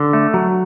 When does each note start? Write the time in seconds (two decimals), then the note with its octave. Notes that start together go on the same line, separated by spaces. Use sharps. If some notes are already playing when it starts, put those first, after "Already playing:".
Already playing: D3
0.13 A3
0.34 F#3